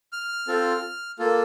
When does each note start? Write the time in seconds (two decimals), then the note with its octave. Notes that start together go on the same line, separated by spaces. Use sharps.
0.13 F6
0.48 C4 F4 A4
1.19 A#3 F4 A4